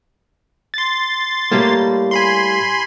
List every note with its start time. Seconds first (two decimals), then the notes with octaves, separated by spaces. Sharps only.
0.74 C6 A6
1.52 A2 G3 A#3
2.11 G#5 B5 C6